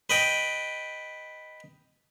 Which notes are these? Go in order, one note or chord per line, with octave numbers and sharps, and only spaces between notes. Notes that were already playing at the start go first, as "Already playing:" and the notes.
B4 D#5 G5